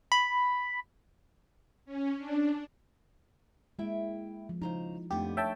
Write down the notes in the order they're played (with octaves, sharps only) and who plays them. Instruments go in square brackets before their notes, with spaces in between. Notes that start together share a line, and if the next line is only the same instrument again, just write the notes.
[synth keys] B5
[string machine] C#4
D4
[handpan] G#3 A#3 [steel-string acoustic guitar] E4 E5 G5
[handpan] F3
[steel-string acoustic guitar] C#3 C5 A#5 [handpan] F3 D#4 E4
[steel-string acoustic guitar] F2 B3 [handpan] A3 D4 D#4 [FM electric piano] G4
[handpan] C#5 [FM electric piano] E5 G5 A5